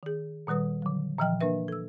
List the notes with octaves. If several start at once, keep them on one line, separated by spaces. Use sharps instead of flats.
D#3 G#4
A#2 D#3 G3 B4 D#6
D3 F#3
A#2 E3 F3 D#5 G5 F6
A#3 D4 A#4 B4 E5
A4 E6